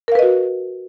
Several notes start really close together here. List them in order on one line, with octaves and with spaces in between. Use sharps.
A#4 F5 B4 D#5 F#4